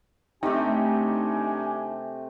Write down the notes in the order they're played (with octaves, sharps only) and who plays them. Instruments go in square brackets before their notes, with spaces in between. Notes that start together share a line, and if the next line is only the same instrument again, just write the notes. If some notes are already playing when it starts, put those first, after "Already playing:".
[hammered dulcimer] C3 A3 [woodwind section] D4 G4 [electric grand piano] D#4 G5 [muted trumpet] G#5